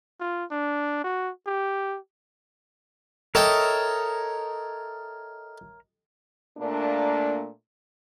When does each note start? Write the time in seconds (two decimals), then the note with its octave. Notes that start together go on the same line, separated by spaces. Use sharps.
0.20 F4
0.51 D4
1.04 F#4
1.46 G4
3.35 A4 A#4 C#5 D#5 E5 G5
6.58 A#2 A3 A#3 D4